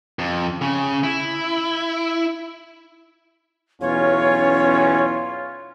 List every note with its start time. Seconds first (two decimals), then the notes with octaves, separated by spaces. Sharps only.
0.19 F2
0.62 C#3
1.04 E4
3.81 B1 E2 C#4 F4 C#5